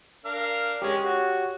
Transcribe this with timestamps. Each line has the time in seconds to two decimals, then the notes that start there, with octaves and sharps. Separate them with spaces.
0.25 D4 A#4 F5
0.82 G#3 C#4 G4 C#5
1.03 F#4